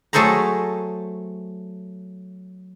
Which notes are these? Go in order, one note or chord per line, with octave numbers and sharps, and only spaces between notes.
F#3 A3 G#4 A4 C5 A#5